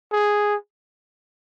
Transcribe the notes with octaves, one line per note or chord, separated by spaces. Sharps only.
G#4